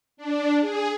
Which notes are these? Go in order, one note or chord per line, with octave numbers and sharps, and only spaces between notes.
D4
G#4